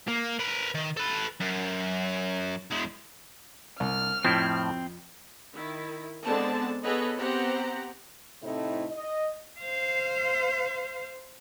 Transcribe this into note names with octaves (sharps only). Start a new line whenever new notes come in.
A#3
A#4 B4
D#3
A4 B4
F#2
E2 G#3
C2 F6
F2 A2 F3 C4 E4
D#3 E4
D3 G#3 B3 C4 D4 A5
B3 G#4 A4 B4 C#5 D#5
B3 C4 G4 C5 F#5 A#5
A2 C3 A3 C4 D#4 E4
D#5
C5 F5